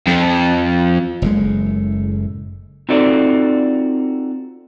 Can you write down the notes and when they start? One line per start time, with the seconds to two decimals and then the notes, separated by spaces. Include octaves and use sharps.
0.07 F2
1.22 F#1 A2 G#3
2.89 C4 D#4 F4 F#4 A4 D5